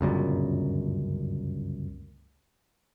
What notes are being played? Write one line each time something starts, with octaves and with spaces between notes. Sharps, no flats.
G1 C#2 F#2 A#2